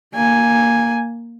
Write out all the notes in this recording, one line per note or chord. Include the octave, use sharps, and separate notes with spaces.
A#3 G#5